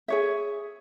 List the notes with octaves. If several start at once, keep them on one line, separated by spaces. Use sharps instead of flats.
G#4 C#5 E5